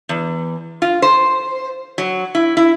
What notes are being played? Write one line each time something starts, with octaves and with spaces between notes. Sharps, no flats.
E2
F4
C5
F#3
E4
E4